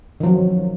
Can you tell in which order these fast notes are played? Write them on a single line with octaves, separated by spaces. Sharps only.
D#3 F3 F#3